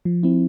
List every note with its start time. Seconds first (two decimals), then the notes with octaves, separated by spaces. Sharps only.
0.05 F3
0.23 C4 E4